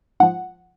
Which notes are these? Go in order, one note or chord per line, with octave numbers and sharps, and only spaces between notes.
G#2 F3 F#5